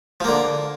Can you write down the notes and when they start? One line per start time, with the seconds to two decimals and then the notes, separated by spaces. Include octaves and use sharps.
0.20 F3
0.24 A#3
0.28 D3